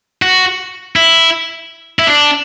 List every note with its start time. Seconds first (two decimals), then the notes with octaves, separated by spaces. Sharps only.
0.22 F#4
0.96 E4
1.99 E4
2.07 D4